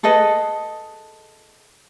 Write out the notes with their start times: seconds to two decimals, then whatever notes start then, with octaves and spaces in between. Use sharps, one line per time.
0.03 G#4 A4 B4 D#5